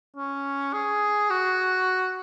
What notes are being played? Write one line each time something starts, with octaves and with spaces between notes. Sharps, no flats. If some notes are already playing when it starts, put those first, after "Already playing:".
C#4
G#4
F#4